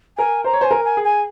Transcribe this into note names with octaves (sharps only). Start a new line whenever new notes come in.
A#4 G#5
C5 A#5
C#5
C5 G#5
A#4
G#5
G#4
G#5